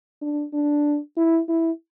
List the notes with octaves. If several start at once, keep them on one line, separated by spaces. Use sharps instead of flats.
D4
D4
E4
E4